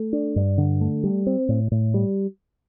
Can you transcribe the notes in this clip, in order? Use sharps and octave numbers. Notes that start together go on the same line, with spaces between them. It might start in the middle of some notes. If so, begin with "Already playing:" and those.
Already playing: A3
D4
G2
D3
A3
G3
C4
A2
A2
G3